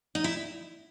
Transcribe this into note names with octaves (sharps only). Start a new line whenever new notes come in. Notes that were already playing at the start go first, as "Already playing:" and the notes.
D#4
E4